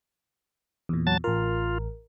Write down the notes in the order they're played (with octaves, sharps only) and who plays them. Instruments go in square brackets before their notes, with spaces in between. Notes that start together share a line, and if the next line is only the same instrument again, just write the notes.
[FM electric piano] E2 A#2
[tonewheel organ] F#3 A5 A6
[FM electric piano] A1 A#4 [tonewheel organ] F4